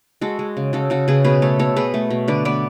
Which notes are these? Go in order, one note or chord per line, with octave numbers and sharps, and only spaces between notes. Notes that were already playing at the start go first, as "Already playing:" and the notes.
G#3 F#4 A4
G#3
C#3
C#3 F#4 A4
C#3 F#4 A4
C#3 G#4 B4
B2 G#4 B4
A3 A4 C#5
B2 A4 C#5
B2 G#4 B4
A3
B2
D3 B4 D5
B3 B4 D5